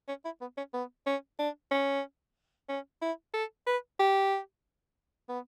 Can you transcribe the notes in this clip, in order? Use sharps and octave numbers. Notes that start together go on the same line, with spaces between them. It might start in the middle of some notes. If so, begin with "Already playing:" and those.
C#4
E4
B3
C#4
B3
C#4
D4
C#4
C#4
E4
A4
B4
G4
B3